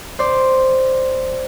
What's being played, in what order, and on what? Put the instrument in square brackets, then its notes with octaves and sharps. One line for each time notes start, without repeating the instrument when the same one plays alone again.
[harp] C5 D5